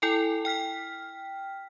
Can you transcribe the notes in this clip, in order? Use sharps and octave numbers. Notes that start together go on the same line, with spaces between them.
E4 A4 G5 G#5
G5 F6 B6